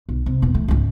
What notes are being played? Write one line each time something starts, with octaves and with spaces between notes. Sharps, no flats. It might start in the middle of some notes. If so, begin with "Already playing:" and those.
B1
C3
D#1 B2
E3 A3
C#2 G#2